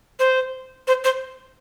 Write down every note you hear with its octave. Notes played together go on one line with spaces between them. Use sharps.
C5
C5
C5